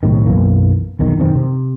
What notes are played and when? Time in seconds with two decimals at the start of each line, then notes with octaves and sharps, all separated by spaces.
0.03 B1 A2 C3 D#3
0.26 B1 F#2 E3 A#3
0.99 B1 E2 D#3
1.18 E1 F#2 D#3 C4
1.35 C3